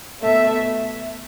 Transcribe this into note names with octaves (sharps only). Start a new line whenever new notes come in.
B2 A3 E5